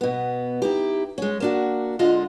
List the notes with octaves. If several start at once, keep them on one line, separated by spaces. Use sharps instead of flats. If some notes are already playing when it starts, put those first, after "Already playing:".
B2 B3
D#4 E4 G4
G#3 C#4
A#3 D4 F#4
D3 G#3 F4 D#5